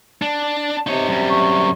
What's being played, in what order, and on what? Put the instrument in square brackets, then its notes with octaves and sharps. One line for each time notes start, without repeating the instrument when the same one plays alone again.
[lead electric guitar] D4
[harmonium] C3 [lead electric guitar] D#4 C#5
[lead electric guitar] F#2 G3
[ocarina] C#6